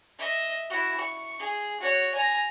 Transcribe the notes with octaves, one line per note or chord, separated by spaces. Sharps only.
D#5 E5
E4 F#4
C#6
G#4
F#4 C#5
G#5 A#5